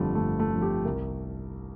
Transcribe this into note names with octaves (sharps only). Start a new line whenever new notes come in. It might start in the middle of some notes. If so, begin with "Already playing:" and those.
Already playing: G1 F2 D3 F3 G3 A3
G1 A3
A3
F2 D3 F3
G4
C2 A#4